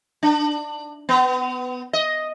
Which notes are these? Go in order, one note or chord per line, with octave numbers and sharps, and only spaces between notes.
D4
B3
D#5